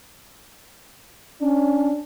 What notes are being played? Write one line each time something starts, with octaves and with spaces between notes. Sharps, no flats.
C#4 D4